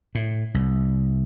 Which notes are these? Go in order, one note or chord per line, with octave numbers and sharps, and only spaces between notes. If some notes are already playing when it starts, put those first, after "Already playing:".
A2
C2